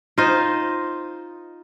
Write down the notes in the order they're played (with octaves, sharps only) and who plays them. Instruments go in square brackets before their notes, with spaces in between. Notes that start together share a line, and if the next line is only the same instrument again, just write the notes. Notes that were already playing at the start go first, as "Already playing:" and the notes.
[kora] D#4 F4 C5 D#5